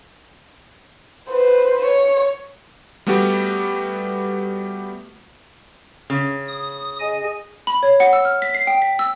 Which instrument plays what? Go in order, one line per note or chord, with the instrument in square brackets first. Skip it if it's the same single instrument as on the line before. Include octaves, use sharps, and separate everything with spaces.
[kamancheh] B4 C5
C#5
[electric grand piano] G3 A3 B3 F#4 G4
[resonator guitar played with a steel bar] C#3
[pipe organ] D#6
G#4 D#5 G#5
[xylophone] B5
C#5
F#5
E6
F6
B6
C7
G5
B6
E6